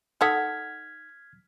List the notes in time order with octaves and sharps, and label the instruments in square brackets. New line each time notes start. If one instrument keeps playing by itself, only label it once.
[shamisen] D#4 A4 F#5 [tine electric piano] F6 G#6 B6